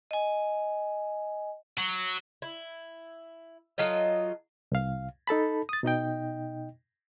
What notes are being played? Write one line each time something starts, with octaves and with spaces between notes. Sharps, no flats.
D#5 G#5
F#3
E4
F#3 F4 A4 D#5
C2 F5
D#4 A4 A5 B5
D#6 A6
B2 D#4 D#5 G5